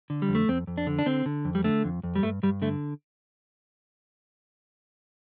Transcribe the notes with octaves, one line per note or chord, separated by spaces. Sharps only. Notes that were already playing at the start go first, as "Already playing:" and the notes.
D3
G3
F2
A3
F2 C4
F2
D4
D3
D4
D3 C4
D3
F2
G3
D3 A3
F2
F2
G3
G2 A3
G2 G3
D3 A3